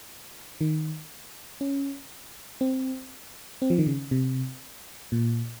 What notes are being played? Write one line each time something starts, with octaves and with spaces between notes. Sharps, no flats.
D#3
C#4
C4
C4
F3
D#3
C#3
C3
A#2